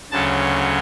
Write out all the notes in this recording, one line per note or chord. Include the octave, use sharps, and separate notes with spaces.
D2 C#3 F#3 A5